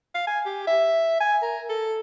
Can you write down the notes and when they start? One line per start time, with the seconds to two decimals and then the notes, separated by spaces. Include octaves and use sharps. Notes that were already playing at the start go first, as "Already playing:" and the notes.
0.14 F5
0.27 G#5
0.46 G4
0.67 E5
1.20 G#5
1.42 A#4
1.70 A4